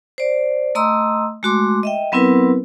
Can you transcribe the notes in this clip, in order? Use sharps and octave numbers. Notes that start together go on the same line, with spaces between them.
C5 D5
A3 D#5 A#5 C6 D#6 E6
G#3 A3 F#4 C6 D6
D#5 E5 G5
F#3 B3 C4 E4 A#4 B4